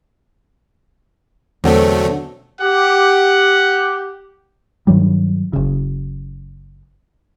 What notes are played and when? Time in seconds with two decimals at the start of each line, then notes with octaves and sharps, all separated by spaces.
1.64 E2 B2 D3 F#3 A3 C4
2.61 G4 F#5
4.87 G2 D#3 F#3 G3
5.53 F#1 C#3